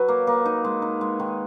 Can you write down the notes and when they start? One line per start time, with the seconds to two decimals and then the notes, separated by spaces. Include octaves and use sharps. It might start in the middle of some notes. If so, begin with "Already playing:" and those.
Already playing: F#3 B4
0.08 A#3
0.27 A#3
0.46 D#4
0.65 G#3
0.82 D#4
1.01 G#3
1.19 D#3